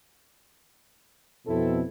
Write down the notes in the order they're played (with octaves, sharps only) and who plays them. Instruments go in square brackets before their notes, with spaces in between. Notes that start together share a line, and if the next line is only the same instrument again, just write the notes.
[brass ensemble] F2 B2 [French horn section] C4 E4 A4